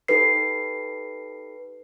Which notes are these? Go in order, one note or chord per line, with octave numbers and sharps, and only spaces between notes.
D#4 G4 A4 B4 C7